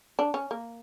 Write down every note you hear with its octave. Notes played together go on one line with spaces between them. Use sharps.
D4
C#4
A#3